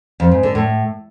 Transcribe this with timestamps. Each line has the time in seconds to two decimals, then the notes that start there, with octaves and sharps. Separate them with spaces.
0.20 F2
0.31 G#2
0.43 D3
0.55 A2